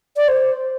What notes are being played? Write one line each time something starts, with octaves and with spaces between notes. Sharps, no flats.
D5
C5